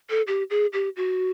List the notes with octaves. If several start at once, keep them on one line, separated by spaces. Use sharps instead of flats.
A4
G4
G#4
G4
F#4